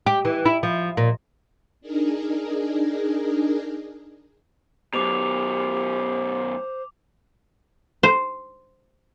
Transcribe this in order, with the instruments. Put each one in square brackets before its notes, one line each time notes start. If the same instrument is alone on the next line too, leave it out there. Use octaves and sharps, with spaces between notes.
[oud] G4
E3
E4
F3
A#2
[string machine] D4 D#4 G#4 A#4
[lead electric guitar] F#2 B2 [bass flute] G4 [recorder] C5 [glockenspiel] D6 F7
[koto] C5